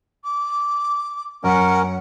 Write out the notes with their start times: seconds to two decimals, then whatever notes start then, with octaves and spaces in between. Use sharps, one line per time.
0.24 D6
1.44 F#2 C#4 A#4 F#5